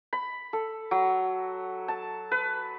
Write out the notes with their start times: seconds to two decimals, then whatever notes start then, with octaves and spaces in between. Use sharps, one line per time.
0.13 B5
0.53 A4
0.91 F#3
1.88 A5
2.31 B4